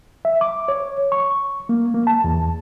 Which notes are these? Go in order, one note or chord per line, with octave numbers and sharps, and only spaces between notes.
E5
D6
C#5
C#6
A#3
A#3
A5
E2